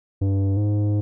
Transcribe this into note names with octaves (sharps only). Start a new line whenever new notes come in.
G2
G#2